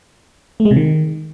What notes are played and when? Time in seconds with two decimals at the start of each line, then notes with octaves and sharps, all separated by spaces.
0.60 A3
0.65 G#3
0.71 C3
0.76 D#3